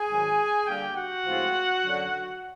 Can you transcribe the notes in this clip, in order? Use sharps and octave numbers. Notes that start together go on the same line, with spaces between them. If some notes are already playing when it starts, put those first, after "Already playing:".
Already playing: G#4 G#5
G#2 D#3 F#3
D3 G3 A#3 G4 G5
F#4 F#5
A2 F3 G#3 C4 F4
F#2 D3 F#3